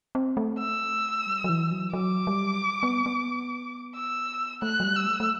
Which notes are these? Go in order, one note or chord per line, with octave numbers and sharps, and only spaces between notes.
C4
A3
E6
G3
F#3
E3
F#3
F#3 D6
G3
B3
B3
E6
A3 F#6
F#3
G3
E6
A3
A3